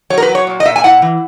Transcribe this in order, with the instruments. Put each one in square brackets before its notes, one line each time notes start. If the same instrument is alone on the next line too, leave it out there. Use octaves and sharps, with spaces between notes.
[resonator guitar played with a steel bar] F#3 C#5
A#4
B4
F#3
C#5
A#2
D#5
A#2 E5
G#5
E4 F#5
E3